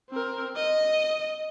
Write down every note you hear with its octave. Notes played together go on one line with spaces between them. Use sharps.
C4 A#4
D#5